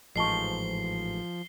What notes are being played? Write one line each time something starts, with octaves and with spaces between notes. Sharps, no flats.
A1 G#2 F3 D#5 A5 C#6 C7 G7